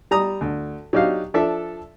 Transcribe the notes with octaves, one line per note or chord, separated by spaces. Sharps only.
G3 A#5 D#6
D2
F#3 D4 D#4 G4 F5
F3 D4 A4 E5